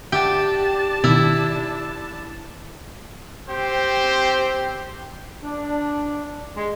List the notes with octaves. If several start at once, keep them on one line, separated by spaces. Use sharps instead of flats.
D4 G4 E5 F#5 A5
B2 D#3 E4
C4 G4 C5
D4
G#3